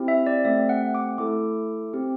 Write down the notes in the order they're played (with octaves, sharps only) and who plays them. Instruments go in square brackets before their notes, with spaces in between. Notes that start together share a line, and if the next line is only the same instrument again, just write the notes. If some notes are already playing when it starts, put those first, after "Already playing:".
Already playing: [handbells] C4 E4 G4
E5
D5
A3 C4 G4 E5
F#5
D6
A3 E4 A4 D6
C4 G4